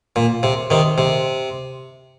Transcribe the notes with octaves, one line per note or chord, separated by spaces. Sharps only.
A#2
C3
C3 D#3
C3